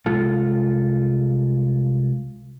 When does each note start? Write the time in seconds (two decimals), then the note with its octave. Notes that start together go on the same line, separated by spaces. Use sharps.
0.06 C2 G#3 F4 A4